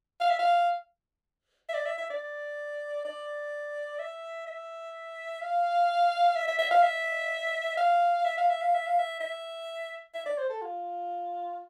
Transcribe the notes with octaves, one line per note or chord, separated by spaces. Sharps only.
F5
E5
F5
E5
D5
E5
E5
D5
D5
E5
E5
F5
E5
E5
E5
F5
E5
F5
E5
F5
E5
F5
E5
F5
E5
E5
E5
D5
C5
A4
F4